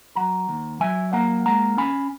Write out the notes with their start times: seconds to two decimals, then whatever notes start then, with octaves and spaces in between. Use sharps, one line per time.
0.16 F#3 F#5 A#5
0.49 D#2
0.80 F#3 E5 G#5
1.13 A#3 F#5 A#5
1.46 G#3 F#5 A#5
1.77 C#4 G#5 B5